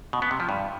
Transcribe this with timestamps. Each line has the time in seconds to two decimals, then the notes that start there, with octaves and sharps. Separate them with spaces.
0.13 B2
0.22 B3
0.31 C3
0.40 F3
0.49 G2